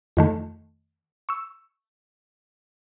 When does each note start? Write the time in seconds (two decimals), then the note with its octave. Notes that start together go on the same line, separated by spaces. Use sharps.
0.17 F2 D#3 A3
1.29 C#6 E6